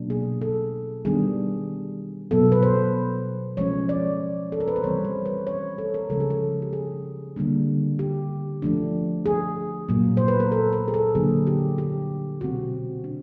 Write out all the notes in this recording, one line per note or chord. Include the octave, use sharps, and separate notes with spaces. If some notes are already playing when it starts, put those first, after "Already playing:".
Already playing: B2 F#3 A#3 D4
G#4
A4
D#3 G3 B3 D4 G#4
B2 F#3 B3 A4
B4
C5
F3 G#3 C#4 C#5
D5
A4
A#4
B4
C5
E3 G3 C4 C#5
C5
B4
C#5
A4
A#4
C#3 F3 G#3 C#4 A4
G#4
A4
G4
G#4
D3 G3 A#3 D4
G4
F3 A3 D4
G#4
A#2 F#3 A#3
C5
B4
A#4
A4
A#4
G#4
A4
D3 F#3 A#3 D4 G#4
G4
G4
B2 G#3 C4 F#4
D4